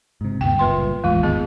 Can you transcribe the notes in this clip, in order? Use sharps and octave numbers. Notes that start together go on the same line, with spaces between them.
G#2 C3
D2 G2 B3 G5
F#1 A#2 G3 B4 C6
E1 A1 E2 G#3 F4
G#1 D#2 B3 G#4 D#5